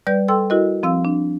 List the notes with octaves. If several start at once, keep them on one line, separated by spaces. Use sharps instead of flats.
G3 B4 D5 G6
A4 G5 C6 E6
E4 F#4 A#4 D#5
F3 C4 F5 E6
D4